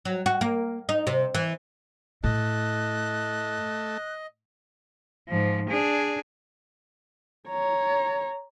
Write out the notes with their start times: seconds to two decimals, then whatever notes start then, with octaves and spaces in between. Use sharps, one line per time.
0.05 F#3
0.26 F#4
0.41 A#3
0.89 D#4
1.07 C3
1.35 E3
2.24 A2 A3 D#5 F#6
5.28 G#2 F3
5.70 D4 G#4
7.49 C#5 A#5